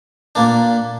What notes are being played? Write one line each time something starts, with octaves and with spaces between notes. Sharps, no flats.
A#2 A#3 D4